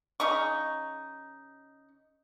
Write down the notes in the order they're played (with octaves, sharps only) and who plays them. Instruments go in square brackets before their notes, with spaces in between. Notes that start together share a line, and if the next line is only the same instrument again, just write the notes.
[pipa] C#3 D#4 C#6